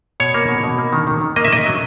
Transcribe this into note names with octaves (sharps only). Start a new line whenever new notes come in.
B2 C#5
A#3
B2
B2
A#3
D#3
D#3
D#3
A#3 D#5
E5
A#3 D#5
F#3